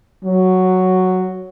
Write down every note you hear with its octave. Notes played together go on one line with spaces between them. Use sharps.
F#3